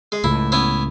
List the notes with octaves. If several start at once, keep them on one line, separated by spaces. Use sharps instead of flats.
G#3
C#2 A2 E4
B3 C#4 E4